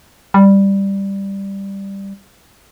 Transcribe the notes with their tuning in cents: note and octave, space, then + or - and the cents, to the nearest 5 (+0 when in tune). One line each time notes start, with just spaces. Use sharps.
G3 +5